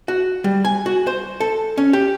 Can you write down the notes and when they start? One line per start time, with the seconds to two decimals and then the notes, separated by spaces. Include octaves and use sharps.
0.08 F#4
0.44 G3
0.65 G#5
0.86 F#4
1.07 C5
1.40 A4
1.77 C#4
1.93 G4